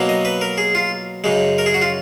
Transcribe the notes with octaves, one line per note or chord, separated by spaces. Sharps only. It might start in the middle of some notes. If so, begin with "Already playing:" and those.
Already playing: B2 F#3 A#3
D#5
B4
A#4
G#4
F4
F#2 C#3 G#3
A#4
G#4
F#4
F4